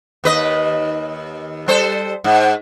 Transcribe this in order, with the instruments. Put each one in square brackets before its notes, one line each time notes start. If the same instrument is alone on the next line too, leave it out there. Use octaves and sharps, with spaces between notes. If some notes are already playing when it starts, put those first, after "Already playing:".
[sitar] D#2 B4 D#5
G3 A4 C5
G#2